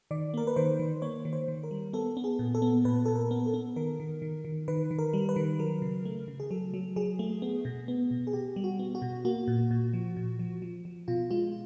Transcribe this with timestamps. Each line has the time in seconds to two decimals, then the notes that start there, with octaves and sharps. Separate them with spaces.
0.11 D#3 D5
0.34 A#3 A#4
0.47 B4
0.56 D#3 C5
0.79 D#3
1.02 A#3 C#5
1.25 D#3
1.33 C5
1.48 D#3
1.63 A#4
1.71 G3
1.93 B3 A4
2.17 B3
2.24 G#4
2.39 A#2
2.55 A4
2.62 B3
2.85 A#2 B4
3.05 A#2 A4
3.16 A#4
3.31 B3
3.46 A4
3.54 B3
3.76 D#3 A#4
4.00 D#3
4.22 D#3
4.45 D#3
4.68 D#3 B4
4.91 D#3
4.99 A#4
5.13 G3
5.29 B4
5.36 D#3
5.59 F#3 A#4
5.82 C#3
6.05 A3
6.28 C#3
6.40 G#4
6.51 F#3 A4
6.74 F#3
6.96 F#3 G#4
7.19 A3
7.42 B3
7.65 B2
7.88 B3
8.11 B2
8.27 G#4
8.33 B2 G4
8.56 G3
8.64 F#4
8.79 B3
8.95 F#4
9.02 B2
9.25 A#3 F#4
9.48 A#2
9.71 A#2
9.93 F3
10.17 A#2
10.39 F3
10.62 F3
10.85 F3
11.08 B2 F4
11.30 G#3 F4